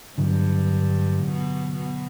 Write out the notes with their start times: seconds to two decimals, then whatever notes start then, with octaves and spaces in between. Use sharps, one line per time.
0.18 G2 D3 F#3 B3 D4
1.23 B2
1.76 B2